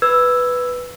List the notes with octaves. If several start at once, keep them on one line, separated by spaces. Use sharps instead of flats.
B4 E6 G#6